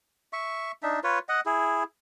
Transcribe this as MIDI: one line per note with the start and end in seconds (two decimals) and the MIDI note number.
0.33 0.72 76
0.33 0.72 85
0.83 1.00 62
0.83 1.00 63
0.83 1.00 76
1.04 1.19 65
1.04 1.19 71
1.04 1.19 73
1.29 1.40 75
1.29 1.40 78
1.46 1.84 64
1.46 1.84 68